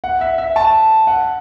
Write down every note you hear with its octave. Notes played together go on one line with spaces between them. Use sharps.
F#5
E5
E5
A5
F#5